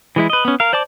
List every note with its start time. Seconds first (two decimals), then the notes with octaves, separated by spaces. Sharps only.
0.16 E3 G#3 E4
0.30 B4 D#5
0.45 B3 C#4
0.60 A#4 F5
0.73 C5 D5 A5 D6